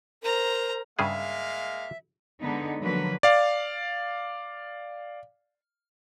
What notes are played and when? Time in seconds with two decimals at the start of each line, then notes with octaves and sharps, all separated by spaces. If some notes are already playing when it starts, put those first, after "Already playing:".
0.23 A#4 C5 A#5
0.99 G2 C#3 G#3 A#3 G#4 E5 F5
2.39 D3 G#3 B3 D#4
2.81 D3 F3 F#3 A#3 B4
3.23 D5 F5